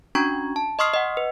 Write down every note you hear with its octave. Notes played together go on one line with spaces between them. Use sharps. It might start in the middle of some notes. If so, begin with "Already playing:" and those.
C#4 D4 F#4 A#5 C#6 G#6
A5
D#5 C6 C#6 D#6 F6 C7
D#5 F#5
B4